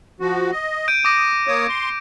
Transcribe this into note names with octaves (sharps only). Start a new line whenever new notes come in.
F3 F#4
D#5
G6 D7 D#7
D6 D#6 A#6
A#3 C#5 D#6
C6